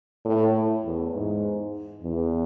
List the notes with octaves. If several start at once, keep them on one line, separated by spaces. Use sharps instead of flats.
A2
E2
G#2
E2